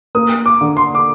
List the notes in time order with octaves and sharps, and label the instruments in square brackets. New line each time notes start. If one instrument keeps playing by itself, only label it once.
[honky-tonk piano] A#3 [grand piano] D#6
[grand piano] D6
[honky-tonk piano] D3
[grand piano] C6
D6